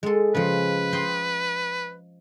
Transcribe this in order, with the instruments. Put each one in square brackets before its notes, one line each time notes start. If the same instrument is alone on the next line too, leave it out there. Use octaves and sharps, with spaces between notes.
[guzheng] G#3 A4
[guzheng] C#3 F3 [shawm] B4
[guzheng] D#5 G5 C6